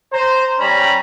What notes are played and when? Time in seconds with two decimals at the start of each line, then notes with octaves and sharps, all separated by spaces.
0.12 C5 A#5
0.59 G3 C#4 A#5 B5